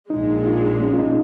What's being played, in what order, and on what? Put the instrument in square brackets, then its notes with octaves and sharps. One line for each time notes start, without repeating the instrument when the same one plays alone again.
[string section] A#1 A#2 G#3 [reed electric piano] D#4
[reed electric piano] F4
C#4
F4
D#4